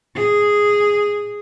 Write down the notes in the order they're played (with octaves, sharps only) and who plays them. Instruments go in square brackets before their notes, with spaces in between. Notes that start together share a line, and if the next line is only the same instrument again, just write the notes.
[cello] G#4